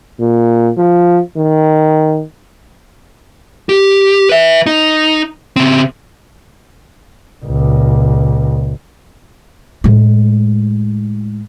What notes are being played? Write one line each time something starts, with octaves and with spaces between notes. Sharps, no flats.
A#2
F3
D#3
G4
B4 E5
D#4
C#3 C4
C#2 A#2
A2 G#3